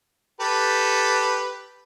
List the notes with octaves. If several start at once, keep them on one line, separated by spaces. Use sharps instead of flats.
G4 A4 B4